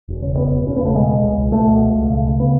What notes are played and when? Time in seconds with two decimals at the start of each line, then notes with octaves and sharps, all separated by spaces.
0.08 E1
0.22 C#3
0.37 E2 B3
0.52 E1
0.66 E1 C#4
0.76 B3
0.80 C#3 A3
0.95 B2 G#3
1.09 B2
1.23 C#2
1.38 C#2
1.52 B2 A3
1.67 B2
1.82 C#2
1.96 C#2
2.10 C#3
2.25 C#3
2.40 B3